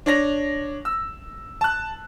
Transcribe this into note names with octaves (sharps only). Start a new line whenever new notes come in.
D4 C#5 A#6 F7
E6
A5 F#6